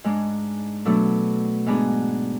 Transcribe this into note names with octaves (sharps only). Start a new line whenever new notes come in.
G#2 G#3 D4
B2 F#3 A3 D4 A4
G#2 G#3 B3 D4 G#4